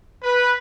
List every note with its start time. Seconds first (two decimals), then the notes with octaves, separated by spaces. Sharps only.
0.23 B4